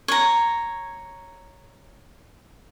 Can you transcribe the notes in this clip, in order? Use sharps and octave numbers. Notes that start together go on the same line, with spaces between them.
C#5 A#5